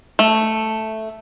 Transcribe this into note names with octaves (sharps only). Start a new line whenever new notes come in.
A3